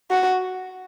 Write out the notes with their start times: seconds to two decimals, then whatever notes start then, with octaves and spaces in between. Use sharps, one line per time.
0.11 F#4